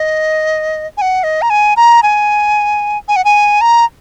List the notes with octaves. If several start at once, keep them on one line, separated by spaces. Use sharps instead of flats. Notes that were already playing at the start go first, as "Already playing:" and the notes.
Already playing: D#5
G#5
F#5
D#5
A#5
G#5
A#5
G#5
G#5
F#5
G#5
A#5